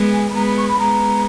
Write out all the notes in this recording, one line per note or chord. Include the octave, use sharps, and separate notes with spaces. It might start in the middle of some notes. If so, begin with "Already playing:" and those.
Already playing: G#3 B3
G#5
B5
G#3 B3 A#5
B5
C#6
B5
G#3 B3 A#5